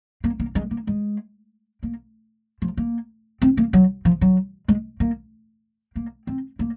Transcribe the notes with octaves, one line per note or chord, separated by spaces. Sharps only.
A#3
A#3
G#3
A#3
G#3
A#3
F3
A#3
C4
A#3
F#3
F3
F#3
G#3
A#3
A#3
C4
A#3